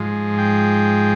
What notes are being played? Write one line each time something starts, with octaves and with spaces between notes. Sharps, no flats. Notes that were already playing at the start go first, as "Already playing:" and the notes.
Already playing: G#2 F3 G#3
G5